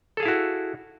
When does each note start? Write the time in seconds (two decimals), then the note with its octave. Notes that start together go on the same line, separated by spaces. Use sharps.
0.17 A4
0.20 G#4
0.23 F5
0.25 E4
0.28 F#4